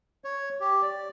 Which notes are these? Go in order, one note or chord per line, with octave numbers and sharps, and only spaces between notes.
C#5
G4
D5